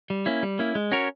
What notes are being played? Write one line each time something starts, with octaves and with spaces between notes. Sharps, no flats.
G3
A#3 C#4 E4
G3
A#3 C#4 E4
G#3
C#4 F#4 A#4 C#5